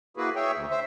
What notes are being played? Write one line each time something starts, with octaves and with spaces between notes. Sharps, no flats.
A#3 E4 F#4 G#4 B4
G#4 C#5 E5 G5
D2
C5 E5